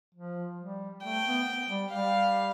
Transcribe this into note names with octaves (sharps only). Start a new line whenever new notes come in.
F3
G3
A3 G5
B3
G3
G3 F5